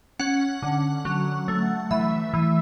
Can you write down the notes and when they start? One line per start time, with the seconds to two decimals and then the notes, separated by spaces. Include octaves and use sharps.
0.19 C#4 F#5
0.62 D3
1.05 F#3
1.48 A3
1.91 E3 E5
2.34 E3